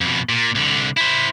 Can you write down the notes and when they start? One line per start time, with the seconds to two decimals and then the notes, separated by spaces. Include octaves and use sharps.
0.01 F2 B2
0.29 A#2
0.55 C2 D3
0.97 E4 C5